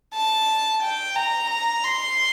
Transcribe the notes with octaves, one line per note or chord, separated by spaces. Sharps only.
A5
G5
A#5
A#5
C6